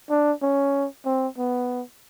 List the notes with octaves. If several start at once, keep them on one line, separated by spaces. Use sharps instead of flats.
D4
C#4
C4
B3